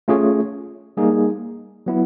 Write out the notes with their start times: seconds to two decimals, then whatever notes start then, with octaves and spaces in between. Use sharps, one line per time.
0.08 A3 C#4 F4 G#4 C#5
0.97 G3 A#3 D#4 G#4
1.86 F#3 B3 E4